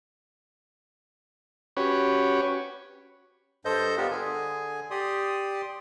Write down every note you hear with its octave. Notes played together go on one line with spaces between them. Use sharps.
C#4 F#4 G4 B4 C#5
G2 A4 C5 D#5 G6
B3 D4 F4 G4 A4 A#4
D3 G#4 G#5
G4 D5 C6 D#6